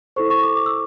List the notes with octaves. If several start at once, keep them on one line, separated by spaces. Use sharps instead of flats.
E4 A4 C5 C#6
C#6
D6
D6
E6